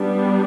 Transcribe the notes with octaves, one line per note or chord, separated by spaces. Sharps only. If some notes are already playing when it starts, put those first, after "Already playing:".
Already playing: G3 B3 D4